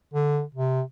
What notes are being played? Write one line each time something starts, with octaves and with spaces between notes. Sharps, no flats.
D3
C3